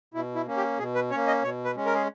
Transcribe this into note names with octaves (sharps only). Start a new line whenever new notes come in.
B2 E4
E4
A#3 C#4
G4
B2 G#4
B4
A#3 C#4 C#5
D#5
B2 C#5
B4
G#3 C#4
A#4
G#4